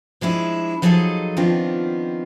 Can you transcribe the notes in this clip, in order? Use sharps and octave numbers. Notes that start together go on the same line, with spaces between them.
F3 G#3 D4 E4
F3 F#3 D#4 G#4 A4 D#5
D#3 F3 B3 C4 D4 F4